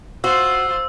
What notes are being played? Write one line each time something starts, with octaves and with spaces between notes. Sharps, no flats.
F4 F#4 C5 E6